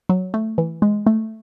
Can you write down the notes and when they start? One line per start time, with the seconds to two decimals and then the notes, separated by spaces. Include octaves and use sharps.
0.09 F#3
0.34 A3
0.58 E3
0.82 G#3
1.07 A3